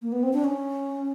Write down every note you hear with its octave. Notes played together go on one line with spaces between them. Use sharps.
A#3
B3
C4
D4
C#4